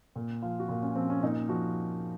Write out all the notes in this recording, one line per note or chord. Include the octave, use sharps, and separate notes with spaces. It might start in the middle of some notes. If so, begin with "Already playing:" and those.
A#2
F3 F4
F#4
A#2 F4
C#4
F3 C4
C#4
A#2 D#4
F3 F#4